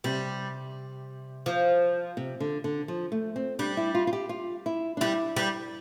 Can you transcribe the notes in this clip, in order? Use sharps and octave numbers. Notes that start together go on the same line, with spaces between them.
C3 G3
F3
C3
D3
D3
F3
A3
C4
G3 D4
E4
F4
F4
G4
F4
E4
D4
G3 E4
G3